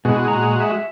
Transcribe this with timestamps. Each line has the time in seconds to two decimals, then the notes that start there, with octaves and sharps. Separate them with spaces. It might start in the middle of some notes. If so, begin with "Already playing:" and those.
0.05 B2 G#3 E4 F#4
0.28 A#2 A#5
0.60 E5